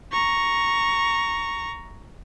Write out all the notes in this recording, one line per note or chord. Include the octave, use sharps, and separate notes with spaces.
A#5 C#6